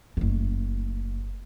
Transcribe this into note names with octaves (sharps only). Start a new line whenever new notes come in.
F#1 A3